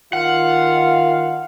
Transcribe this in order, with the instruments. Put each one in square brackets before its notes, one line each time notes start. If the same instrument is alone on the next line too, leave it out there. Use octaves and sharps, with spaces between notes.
[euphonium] D#3 [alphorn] F4 [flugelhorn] F5 [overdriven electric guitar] F#5